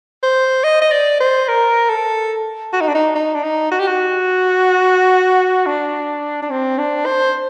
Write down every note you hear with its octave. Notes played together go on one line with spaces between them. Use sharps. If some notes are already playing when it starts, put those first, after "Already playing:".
C5
D#5
D#5
D5
C5
A#4
A4
F#4
D#4
D4
D#4
D#4
D4
D#4
F#4
G4
F#4
D4
D4
C4
D4
C5